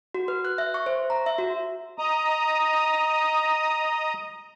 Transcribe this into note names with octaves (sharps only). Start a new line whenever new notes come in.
F#4
B4
F#6
E5
C#6
C5
A#5
E5
F#4
D#5 A#5 D#6